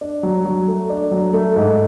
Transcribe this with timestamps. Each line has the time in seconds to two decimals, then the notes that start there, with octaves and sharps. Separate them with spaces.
0.01 D4
0.23 F#3
0.45 F#3
0.68 A3
0.90 D4
1.11 F#3
1.33 A3
1.56 G#2